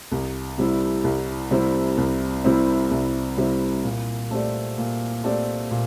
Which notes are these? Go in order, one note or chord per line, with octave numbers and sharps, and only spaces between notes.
C2
C3 G3 C4 E4
C2
C3 G3 C4 E4
C2
C3 G3 C4 E4
C2
C3 G3 C4 E4
A#2
A3 C4 G4 D5
A#2
A3 C4 G4 D5
A#2